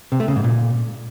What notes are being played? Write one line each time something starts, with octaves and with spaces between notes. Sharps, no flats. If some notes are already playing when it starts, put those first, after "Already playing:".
C3
A3
C#3
G#2
A#2